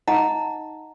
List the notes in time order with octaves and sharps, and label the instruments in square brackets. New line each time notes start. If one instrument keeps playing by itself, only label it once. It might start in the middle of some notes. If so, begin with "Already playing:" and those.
[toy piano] D#4 D#5 F#5 A#5